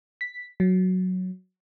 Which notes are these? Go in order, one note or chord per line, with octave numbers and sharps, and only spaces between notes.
B6
F#3